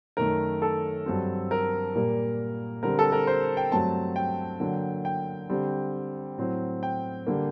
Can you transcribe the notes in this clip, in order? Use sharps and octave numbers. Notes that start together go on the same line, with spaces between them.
F#2 D#3 A3 A#4
A4
G2 F#3 C4
A#4
A#2 G3 A#3
D3 G3 C4 A#4
A4
A#4
C5
G5
G2 F#3 A3 C4 A5
G5
D3 F#3 A#3
G5
D3 G3 C4
A2 F#3 C4
G5
D3 G3 A#3